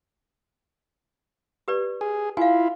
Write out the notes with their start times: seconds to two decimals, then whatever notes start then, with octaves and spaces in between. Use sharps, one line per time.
1.68 G4 B4 D5
2.01 G#4
2.37 E4 F4 F5 G#5